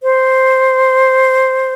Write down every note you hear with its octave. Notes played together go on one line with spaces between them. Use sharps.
C5